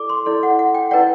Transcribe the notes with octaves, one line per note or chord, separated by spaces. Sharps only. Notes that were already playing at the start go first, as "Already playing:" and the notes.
Already playing: E4 A4 D5 D6
C6
E4 A4 D5
F#5
F#5
G5
E4 B4 D5 F#5